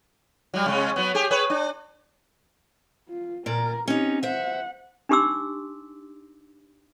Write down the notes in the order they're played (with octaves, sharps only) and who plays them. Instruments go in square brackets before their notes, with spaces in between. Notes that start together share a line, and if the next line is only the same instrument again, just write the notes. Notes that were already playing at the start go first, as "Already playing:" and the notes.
[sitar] F#3 G3
C3 G#3 C#4
F#3 B3
G4 G#4
G#4 B4 C#5
D4
[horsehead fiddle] F4
[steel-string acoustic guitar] A#2 D5 [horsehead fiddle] A#4
[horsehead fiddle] C4 G4 [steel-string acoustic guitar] C#4 D#4
[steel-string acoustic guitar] C5 E5 [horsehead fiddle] F#5
[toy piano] D4 D#4 G4 C6 D6 E6